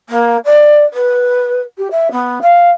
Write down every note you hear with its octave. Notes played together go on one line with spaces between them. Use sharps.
A#3
D5
B4
G4
E5
B3
F5